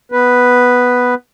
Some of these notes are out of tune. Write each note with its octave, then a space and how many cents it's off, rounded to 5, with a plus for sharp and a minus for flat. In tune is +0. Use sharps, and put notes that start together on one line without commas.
B3 +0 B4 +0